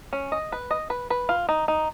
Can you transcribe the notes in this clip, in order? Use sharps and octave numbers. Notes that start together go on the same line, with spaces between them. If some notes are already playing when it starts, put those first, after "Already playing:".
C#4
D#5
B4
D#5
B4
B4
F4
D#4
D#4